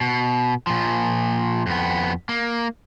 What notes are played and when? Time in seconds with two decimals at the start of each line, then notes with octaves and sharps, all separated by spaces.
0.01 B2
0.67 A#2 F3
1.67 F2 B3
2.29 A#3